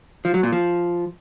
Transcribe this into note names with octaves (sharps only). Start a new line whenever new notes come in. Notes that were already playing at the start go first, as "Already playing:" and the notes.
F3
F#3
A#2
F3